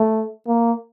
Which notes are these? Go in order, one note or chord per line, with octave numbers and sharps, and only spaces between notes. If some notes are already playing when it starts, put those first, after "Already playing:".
Already playing: A3
A#3